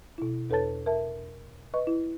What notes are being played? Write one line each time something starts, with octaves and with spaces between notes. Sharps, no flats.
B2 E4
E2 A4 B4 C#5 A5 A6
A#4 E5 A5
B4 D#5 C#6
E4